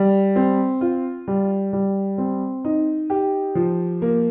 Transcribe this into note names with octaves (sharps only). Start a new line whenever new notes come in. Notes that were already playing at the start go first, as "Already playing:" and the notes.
Already playing: G3
C4
F4
G3
G3
C4
D#4
G4
F3
A#3